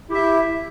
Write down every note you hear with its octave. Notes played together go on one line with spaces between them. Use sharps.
E4 G4 E5